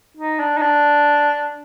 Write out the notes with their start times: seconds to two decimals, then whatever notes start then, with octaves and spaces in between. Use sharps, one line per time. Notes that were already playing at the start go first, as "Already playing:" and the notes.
0.17 D#4
0.40 D4
0.57 D#4
0.62 D4